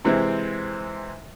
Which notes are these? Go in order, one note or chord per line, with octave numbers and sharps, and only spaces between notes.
C3 E3 G#3 C4